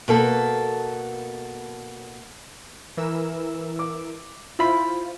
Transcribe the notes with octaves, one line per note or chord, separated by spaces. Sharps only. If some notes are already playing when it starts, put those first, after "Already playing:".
B2 A#3 A4
E3 A#4 E6
D6
E4 F4 C5 B5